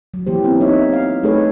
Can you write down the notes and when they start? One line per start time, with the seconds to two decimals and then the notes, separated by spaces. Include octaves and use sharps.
0.14 F#3
0.26 E3 A#3 G4 C5
0.43 B3 C4 E4
0.60 D#4 C#5 E5
0.93 F5
1.23 A3 D#4 G#4 A4 B4 C#5